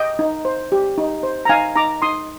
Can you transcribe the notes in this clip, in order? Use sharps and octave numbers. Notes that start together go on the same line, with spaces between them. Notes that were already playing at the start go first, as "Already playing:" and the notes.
Already playing: D#5 G5
D#4
C5
G4
D#4
C5
A#5
D#4 F5 G#5
D#4 A#5 D6
D#4 C6 D#6